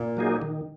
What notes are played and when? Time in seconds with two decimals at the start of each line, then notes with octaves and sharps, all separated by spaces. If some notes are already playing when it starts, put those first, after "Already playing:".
Already playing: A#2
0.17 F#3 A#3 D#4 G#4
0.42 D#3